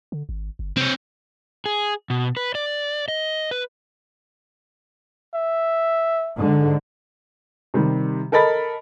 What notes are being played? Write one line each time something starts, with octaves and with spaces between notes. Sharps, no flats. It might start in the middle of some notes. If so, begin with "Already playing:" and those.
D3
G#1
G1
C3 C4 C#5
G#4
B2
B4
D5
D#5
B4
E5
G#2 D3
C3 D#3 G3
A4 A#4 D#5 B5 A6